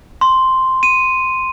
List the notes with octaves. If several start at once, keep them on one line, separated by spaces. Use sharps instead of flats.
C6
D#7